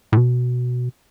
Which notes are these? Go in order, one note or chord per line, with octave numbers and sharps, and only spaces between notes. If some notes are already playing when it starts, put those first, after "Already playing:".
A2
B2